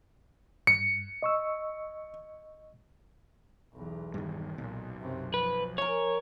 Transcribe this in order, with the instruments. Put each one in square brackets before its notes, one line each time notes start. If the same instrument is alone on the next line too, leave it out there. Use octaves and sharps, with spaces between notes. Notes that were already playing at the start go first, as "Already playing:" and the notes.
[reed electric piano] G2 [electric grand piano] C#7
[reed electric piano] D#5 C#6 E6
[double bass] B1 E2
[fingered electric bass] G2 D#3
[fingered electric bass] B1 [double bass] A#2
[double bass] F#2 C3
[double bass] F3 [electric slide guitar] B4
[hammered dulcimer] A#4 G#5 [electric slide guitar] C#5